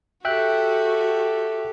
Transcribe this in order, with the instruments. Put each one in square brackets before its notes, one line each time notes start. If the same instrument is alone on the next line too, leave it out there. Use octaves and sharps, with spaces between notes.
[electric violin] F#4 [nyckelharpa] G4 A4 [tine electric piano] E5 G5 F#6